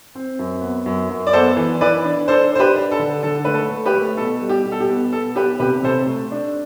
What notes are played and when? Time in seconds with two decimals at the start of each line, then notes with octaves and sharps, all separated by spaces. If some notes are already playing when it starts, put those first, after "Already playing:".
0.15 C4
0.39 F#2
0.61 B3
0.86 F#2
1.09 F#2
1.27 D5
1.33 B3 A4 C5
1.57 E3
1.81 E3 B4 D5
2.04 D4
2.28 D4 A4 C5
2.52 D4 C5
2.59 G4 B4
2.76 D4
2.91 A4
2.99 D3
3.23 D3 A4
3.45 A3 B4
3.54 A4
3.70 A3
3.86 G4 B4
3.94 A3
4.17 B2 A4
4.41 G3
4.49 G4
4.65 B2
4.72 A4
4.80 G4
4.89 B3
5.13 B3 A4
5.36 B3 G4 B4
5.59 C3 G4 B4
5.83 C3 A4 C5
6.07 A3
6.31 D4